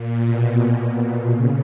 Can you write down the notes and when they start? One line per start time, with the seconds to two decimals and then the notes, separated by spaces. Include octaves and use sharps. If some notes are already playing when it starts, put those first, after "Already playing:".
Already playing: A#2
0.25 B2
1.32 C#3